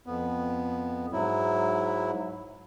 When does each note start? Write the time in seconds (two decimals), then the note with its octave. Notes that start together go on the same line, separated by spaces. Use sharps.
0.06 F2 B3
1.12 G#2 F#3 E4